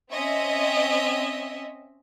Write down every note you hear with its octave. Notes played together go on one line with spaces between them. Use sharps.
C4 C#4 D#5 E5